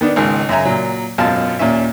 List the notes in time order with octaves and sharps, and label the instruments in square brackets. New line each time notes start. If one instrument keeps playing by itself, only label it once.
[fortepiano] D#3 B3 D4
G#1 C#2 D#3
F#2 C#3 E5 G#5 A#5
A#2 F#3
G#1 F#2 B2 F4 F5 A5
D#2 A#2 C#4 E5